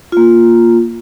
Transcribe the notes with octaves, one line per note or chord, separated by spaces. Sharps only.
A#3 F4